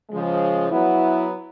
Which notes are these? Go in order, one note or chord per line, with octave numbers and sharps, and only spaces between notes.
C#3 F3 G#3
F#3 B3 E4